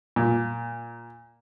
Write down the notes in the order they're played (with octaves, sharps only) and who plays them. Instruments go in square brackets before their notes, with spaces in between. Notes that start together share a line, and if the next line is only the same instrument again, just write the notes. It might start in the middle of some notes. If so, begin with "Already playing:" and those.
[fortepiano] A#2